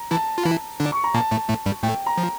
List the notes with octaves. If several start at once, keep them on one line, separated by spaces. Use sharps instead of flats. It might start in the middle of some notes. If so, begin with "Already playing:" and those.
Already playing: A#5
E3 E4 A5
F4
E3 E4
D3 D4
C#6
A#5
A#2 A#3 A5
A2 A3
A2 A3
G2 G3
A2 A3 G5
A#5
F3